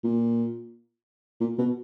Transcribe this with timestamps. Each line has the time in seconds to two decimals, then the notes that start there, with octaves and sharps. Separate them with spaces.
0.04 A#2
1.40 A#2
1.58 B2